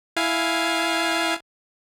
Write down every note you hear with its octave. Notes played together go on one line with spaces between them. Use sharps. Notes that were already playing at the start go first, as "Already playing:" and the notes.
E4 F5 G#5